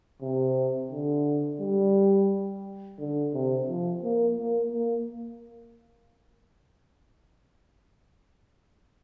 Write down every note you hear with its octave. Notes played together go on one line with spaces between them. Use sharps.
C3
D3
G3
D3
C3
F3
A#3
A#3
A#3